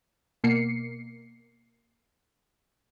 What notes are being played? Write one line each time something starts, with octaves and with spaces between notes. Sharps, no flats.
B2 A#3 C7 C#7